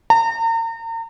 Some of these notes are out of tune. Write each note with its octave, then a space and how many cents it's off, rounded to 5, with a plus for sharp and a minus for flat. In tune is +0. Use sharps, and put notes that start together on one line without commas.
A#5 -40